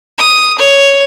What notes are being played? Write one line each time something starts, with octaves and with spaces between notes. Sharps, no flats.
D#6
C#5